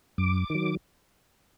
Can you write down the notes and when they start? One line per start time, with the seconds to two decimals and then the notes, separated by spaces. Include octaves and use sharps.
0.18 F#2 D6
0.50 D#3 F#3